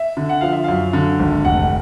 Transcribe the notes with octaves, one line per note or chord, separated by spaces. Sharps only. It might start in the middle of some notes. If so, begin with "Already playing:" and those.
Already playing: E5
D3
F#5
F3 F5
E5
F#2 F5
D3
G#1
F1 F#5